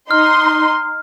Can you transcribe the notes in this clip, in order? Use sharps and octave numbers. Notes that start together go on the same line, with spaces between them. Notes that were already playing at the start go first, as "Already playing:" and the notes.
D#4 C6 F6